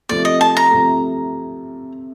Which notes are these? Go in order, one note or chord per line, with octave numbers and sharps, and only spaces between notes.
C3 F3 A3 D5
D#5
A5
A#5
C3 F3 A3